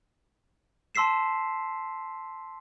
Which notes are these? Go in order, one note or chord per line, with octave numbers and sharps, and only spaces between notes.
A5 C6 E6 B6 C7 E7